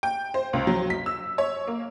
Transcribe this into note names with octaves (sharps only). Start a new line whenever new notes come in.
G5
C5
C#2
F#3
B6
E6
C#5
A#3